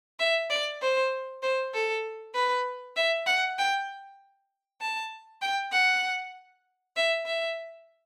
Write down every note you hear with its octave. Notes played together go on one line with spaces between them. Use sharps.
E5
D5
C5
C5
A4
B4
E5
F#5
G5
A5
G5
F#5
E5
E5